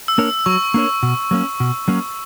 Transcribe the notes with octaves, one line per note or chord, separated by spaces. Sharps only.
E6
A#3 D4 A#4 C#5
F#3 C#6
A#3 D4 A#4 C#5
B2
F#3 A#3 C#4
B2
F#3 A#3 C#4